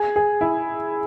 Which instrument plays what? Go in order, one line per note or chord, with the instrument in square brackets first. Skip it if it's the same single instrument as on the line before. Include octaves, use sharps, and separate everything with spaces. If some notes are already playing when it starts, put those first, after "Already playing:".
Already playing: [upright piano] G#4
G#4
E4